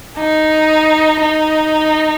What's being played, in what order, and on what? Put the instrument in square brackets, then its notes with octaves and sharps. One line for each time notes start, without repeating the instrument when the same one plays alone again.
[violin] D#4
D#4